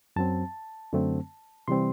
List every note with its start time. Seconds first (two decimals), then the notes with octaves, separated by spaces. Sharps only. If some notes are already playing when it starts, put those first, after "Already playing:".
0.16 F#2 F#3 C4 A5
0.93 F#2 D3 F#3 A3 C4
1.68 C3 E3 G3 C4 C6